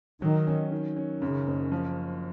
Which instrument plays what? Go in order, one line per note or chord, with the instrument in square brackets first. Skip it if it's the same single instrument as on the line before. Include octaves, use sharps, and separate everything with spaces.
[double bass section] D#3 [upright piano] F#3
[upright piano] C#4
D#3
C#4
[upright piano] F#2 [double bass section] C#3
[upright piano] F#1
F3